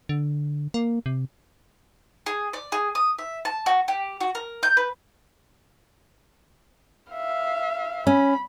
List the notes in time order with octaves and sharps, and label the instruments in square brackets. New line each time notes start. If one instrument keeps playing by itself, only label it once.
[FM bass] D3
A#3
C3
[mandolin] G#4
D5
G#4
D#6
E5
A5
F#4
G4
F#4
A#4
G6
B4
[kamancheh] E5 F5
[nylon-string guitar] C#4 [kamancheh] B5